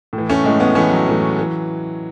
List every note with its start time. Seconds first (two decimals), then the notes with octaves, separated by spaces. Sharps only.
0.13 A2
0.18 E3
0.29 A3 C#4
0.44 A2 E3 G#3
0.60 G#3 B3
0.75 A2 E3 A3 C#4
0.91 F#3
1.08 A2 E3
1.39 E3